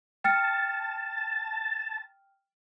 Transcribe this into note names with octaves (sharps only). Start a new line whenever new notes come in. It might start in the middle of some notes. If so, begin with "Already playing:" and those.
G5 A5 F6 C#7